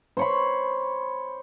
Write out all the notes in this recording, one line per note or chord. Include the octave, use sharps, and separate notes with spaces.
C5 C#5 B5